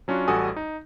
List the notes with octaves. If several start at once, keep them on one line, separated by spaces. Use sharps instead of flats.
F#3 C#4 D4 F4 F#4
A1 G3 F#4 A4 G#5 D#6
D#4